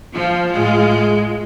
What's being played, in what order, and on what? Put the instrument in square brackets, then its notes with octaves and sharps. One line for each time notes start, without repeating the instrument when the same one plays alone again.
[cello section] F3 [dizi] F4
[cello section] A2 G#3